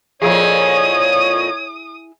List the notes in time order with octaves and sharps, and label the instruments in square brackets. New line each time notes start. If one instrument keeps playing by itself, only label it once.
[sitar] F2 A#2 F3 [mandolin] E4 G#4 [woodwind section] C#5 [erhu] D#6